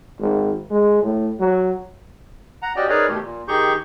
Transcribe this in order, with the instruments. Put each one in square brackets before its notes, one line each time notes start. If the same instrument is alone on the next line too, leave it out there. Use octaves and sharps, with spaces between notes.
[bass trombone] G#1
G#3
A2
F#3
[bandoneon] F#5 A#5
C#4 F#4 G4 D5 D#5 G5
D#4 G#4 A#4 B4 C#5 D5
B2 D#3 A3 G4
A#2
D#3 D#4 G4 G#4 C#6 G6